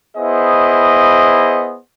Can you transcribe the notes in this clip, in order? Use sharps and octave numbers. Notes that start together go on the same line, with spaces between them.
B3 E4 G#4 C5 D#5